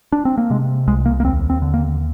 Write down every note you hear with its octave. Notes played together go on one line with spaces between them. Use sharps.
D4
C4
A#3
C3 G#3
C2 G#3
A#3
A#3
D#2 C4
C4
D3
A#3